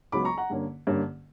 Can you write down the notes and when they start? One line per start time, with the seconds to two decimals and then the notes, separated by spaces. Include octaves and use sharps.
0.12 C#2 C#3 F#3 B3 B5 D6
0.25 A#5 C#6
0.37 F#5 A#5
0.50 G2 D3 A#3 C#4
0.87 G2 D3 A#3 C#4